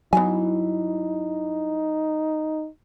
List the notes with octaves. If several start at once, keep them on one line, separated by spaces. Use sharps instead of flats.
G2 E3 F#3 B3 D#4 E4 G#5